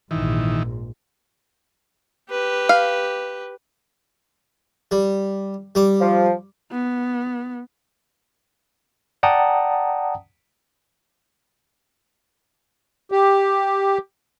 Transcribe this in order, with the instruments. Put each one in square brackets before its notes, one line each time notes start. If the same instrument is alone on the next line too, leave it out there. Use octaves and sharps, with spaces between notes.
[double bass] A#1 G#2 [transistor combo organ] D#3 E3
[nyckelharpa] G4 B4
[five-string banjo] F5
[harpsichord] G3
G3 D6
[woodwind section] F3
[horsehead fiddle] B3
[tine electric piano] D5 F#5 G5 A5 A#5 D#6
[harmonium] G4